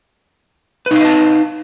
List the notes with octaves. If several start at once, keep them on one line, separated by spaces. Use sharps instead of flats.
D#4 B4 D#5 F5 A5